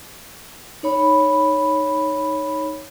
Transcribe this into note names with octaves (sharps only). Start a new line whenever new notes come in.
D#4 C#5 B5